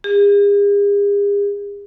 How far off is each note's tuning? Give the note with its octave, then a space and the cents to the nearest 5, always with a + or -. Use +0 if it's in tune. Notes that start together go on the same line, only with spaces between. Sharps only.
G#4 -45